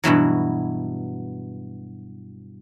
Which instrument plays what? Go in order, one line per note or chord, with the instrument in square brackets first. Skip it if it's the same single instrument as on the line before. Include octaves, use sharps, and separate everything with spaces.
[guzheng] G2 B2 E3 F#3